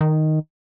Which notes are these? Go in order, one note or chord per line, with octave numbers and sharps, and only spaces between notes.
D#3